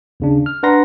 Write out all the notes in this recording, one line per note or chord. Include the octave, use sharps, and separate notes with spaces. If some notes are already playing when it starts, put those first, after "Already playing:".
D#2 C#3 D4
F6
D4 B4 F#5 A#5 C6 A#6